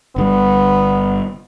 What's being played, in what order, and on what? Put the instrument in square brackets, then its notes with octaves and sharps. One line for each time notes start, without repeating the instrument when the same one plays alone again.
[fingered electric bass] G1 D3 G3 [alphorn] B3